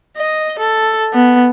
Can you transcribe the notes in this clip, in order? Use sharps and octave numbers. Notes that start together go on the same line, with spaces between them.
D#5
A4
B3